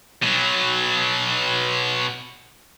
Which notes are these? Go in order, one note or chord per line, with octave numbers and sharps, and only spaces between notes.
B2 F#3